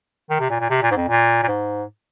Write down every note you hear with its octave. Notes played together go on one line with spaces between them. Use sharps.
D#3
C3
A#2
A#2
C3
A#2
G#2
F2
A#2
A#2
G#2